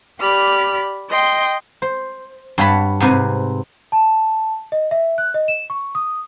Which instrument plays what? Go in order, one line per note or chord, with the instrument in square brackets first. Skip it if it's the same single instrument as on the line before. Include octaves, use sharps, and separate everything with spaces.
[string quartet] G4 D5 B5 F6
D#5 G5 C6
[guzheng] C5
G2 C#5 F#5 A5 B5
G#2 C3 B4 G#5
[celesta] A5
D#5
E5
F#6
D#5
E7
C#6
D#6